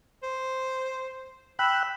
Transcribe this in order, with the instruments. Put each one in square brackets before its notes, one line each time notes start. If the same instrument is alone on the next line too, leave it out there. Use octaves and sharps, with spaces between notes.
[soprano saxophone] C5
[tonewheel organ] G5 E6 F#6 [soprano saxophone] B5